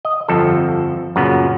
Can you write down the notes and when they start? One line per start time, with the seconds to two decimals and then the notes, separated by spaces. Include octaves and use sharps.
0.05 D#5
0.28 G1 F2 F3 A4
1.16 F#2 A#2 C#3 B3